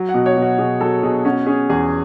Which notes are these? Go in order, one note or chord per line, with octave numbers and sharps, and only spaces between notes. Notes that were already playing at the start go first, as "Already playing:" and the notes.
Already playing: F#3
F#5
B2
C#5
B2
F#4
B2 G#4
F#3 A4
B2 G#4
C#4 F#4
C#4 G#4
E2 G#4